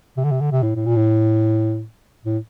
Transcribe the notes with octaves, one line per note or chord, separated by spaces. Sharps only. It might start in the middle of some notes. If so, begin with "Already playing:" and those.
C3
D3
C3
D3
C3
A2
A2
A#2
A2
A2